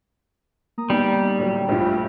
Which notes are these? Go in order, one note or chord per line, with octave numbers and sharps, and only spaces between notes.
A#3 A#5 D#6
G3 B3 D#4
A2 D3 F#3
A#1 G2 A3 F4